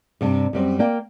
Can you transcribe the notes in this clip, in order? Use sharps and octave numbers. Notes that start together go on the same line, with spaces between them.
G2 C3 D4
F#2 G3 C4
A#3 D5 F5 G5